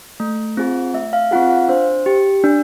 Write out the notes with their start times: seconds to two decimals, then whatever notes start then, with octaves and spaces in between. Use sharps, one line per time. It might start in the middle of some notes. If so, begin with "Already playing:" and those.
0.20 A3
0.57 C4 F4 G#4
0.94 A3 E5
1.13 F5
1.31 C4 F4 G#4 F#5
1.50 F5
1.69 D4 C5
2.06 G4
2.44 D4